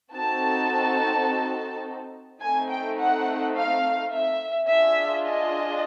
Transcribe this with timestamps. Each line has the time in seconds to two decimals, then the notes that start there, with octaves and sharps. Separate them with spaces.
0.12 C4 D#4 F#4 A4 A5
2.41 A3 C4 D#4 G#5
2.69 G5
2.99 F#5
3.56 F5
4.12 E5
4.70 D4 F4 G#4 E5
5.27 D#5